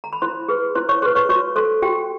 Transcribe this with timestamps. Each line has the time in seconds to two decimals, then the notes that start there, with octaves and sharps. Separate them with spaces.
0.04 A#5
0.13 B5
0.22 E4 C5 C6
0.48 G#4 B4
0.75 E4 C5 C6
0.89 C#5 C#6
1.02 G#4 C5 C6
1.06 B4
1.15 C#5 C#6
1.29 F#4 C#5 C#6
1.56 A4 C5 C6
1.82 F#4 G4 G5